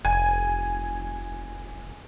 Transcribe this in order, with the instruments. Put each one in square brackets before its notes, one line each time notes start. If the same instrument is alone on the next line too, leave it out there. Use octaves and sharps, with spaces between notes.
[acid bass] F1 [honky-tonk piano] G#5